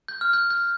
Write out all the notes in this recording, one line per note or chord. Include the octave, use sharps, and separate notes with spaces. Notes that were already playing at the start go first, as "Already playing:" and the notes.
G6
F6
G6
G6